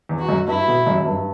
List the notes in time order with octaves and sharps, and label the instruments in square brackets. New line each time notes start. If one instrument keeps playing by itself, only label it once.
[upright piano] E2
[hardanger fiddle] F#4
[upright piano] F#2
[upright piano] G2 [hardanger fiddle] E4
[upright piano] B2
F#2
F#2
G2